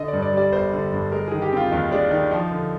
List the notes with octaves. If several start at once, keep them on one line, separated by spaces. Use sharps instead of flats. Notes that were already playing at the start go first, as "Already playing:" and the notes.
Already playing: D3 D#5
D5
G2
D5
G3 D5
G1 C5
D3
G2
G#3 A#4
D#3 G#4
G4
C4 F4
D#2 D#4
G#3 D4
D#3 D#4
F3 D#4
D3